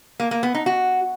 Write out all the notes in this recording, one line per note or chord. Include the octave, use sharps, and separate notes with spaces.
A#3
A#3
B3
D#4
F#4